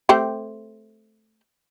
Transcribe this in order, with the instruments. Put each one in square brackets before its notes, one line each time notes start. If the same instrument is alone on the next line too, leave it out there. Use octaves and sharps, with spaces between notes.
[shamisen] A3 C4 G4